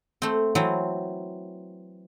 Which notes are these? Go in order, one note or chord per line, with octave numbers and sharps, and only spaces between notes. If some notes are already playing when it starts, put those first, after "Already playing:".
A3 C4
E3 F#3 C4 A#5